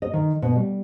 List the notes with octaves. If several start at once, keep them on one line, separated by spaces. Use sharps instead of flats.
D#5
D#3
B2
G3